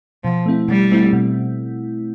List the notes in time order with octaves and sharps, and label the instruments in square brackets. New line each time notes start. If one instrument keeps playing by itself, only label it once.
[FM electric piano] B2 [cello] F3
[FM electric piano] A3 C4 E4
[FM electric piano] B2 [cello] G3
[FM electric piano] A3 C4 E4
B2